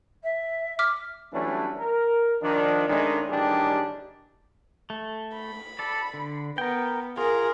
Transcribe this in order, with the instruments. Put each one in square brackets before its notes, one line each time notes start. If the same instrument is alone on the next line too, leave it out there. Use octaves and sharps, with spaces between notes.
[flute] E5
[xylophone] D6 F6 B6
[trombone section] E3 F#3 G3 A3 C#4 D4
A#4
D#3 F3 D4
D#3 G#3 A3 C#4 D4
A1 D#3 G3 D4 G4 G#4
[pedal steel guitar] A3
[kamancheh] B5
[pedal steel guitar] A4 D5
D3
[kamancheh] B3 [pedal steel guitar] A#4 G5
[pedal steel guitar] F4 [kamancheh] G#4 A#4